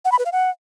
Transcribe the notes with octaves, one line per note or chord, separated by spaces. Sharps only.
F#5
B5
B4
F5
F#5